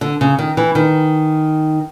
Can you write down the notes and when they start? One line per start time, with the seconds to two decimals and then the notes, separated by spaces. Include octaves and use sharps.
0.01 D3
0.21 C#3
0.39 D#3
0.57 E3
0.75 D#3